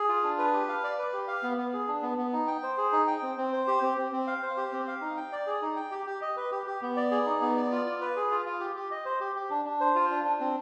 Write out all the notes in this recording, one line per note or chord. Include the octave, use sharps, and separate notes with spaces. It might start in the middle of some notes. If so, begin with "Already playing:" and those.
Already playing: G#4
F4
D4
B4
G4
F5
D5
B4
G4
F5
B3
B3
G#4
D4
B3
B3
D#4
G5
C5
G#4
D#4
G5
C4
C4
C5
G4
C4
C4
C4
F5
C5
G4
C4
F5
D#4
G5
D5
G#4
D#4
G5
G4
G4
D#5
B4
G4
G4
B3
D5
G#4
D#4
B3
D5
F4
F4
B4
G#4
F4
F4
G4
G4
D#5
C5
G4
G4
D4
D4
C5
F4
D4
D4
C4